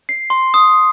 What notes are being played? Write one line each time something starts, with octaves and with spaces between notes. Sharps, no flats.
C7
C6
D#6